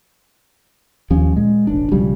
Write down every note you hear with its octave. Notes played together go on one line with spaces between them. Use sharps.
D#2 F3 C#4
A#2 G#3
E1 A1 D4
B1 C#3 F3 G3